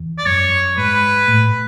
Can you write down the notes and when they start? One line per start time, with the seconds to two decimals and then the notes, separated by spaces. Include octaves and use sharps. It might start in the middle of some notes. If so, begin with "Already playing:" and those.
Already playing: E2
0.18 D5
0.26 F#2 C#5
0.77 G#2 B4
1.28 A2